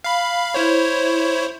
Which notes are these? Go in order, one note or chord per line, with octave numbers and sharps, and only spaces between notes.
F5 B5
E4 C5 C#5